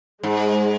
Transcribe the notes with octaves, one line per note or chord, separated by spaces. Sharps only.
G#2 G#3